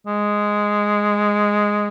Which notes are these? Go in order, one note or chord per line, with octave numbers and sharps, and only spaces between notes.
G#3